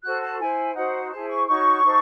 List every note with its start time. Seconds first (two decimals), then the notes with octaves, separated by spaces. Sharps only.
0.04 F#4 A4 C5 F#6
0.21 A5
0.39 E4 C5 G#5
0.75 D#4 F#4 C5 F#5
1.11 E4 G#4 C5 A5
1.29 C#6
1.47 D#4 F#4 C#5 C#6
1.83 D#4 F#4 A4 C5